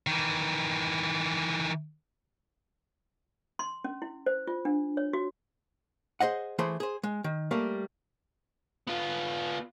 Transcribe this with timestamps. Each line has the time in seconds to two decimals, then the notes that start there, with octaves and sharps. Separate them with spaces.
0.07 D#3 E3
3.59 C6
3.84 C#4
4.02 E4
4.26 C5
4.47 F4
4.65 D4
4.97 C#5
5.13 F#4
6.20 G#4 C5 D#5 F#5
6.59 E3 A3 G#4 C5 B5
6.80 G#4 C5
7.03 G#3
7.24 D#3
7.51 G3 A3 A#3
8.87 B3 F4